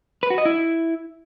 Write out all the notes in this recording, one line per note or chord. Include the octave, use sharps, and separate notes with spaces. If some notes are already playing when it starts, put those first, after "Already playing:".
B4
F#4
D#5
E4